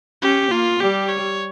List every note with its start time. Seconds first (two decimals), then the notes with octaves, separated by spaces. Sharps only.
0.22 C#4 G4
0.51 A#3 F4
0.80 G3 G4
1.09 C#5